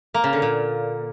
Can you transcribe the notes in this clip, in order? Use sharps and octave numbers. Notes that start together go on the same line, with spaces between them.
A#3
C#3
D3
A#2